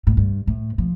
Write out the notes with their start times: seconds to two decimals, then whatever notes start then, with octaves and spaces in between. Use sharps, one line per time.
0.07 A2
0.17 G2
0.47 A2
0.78 F3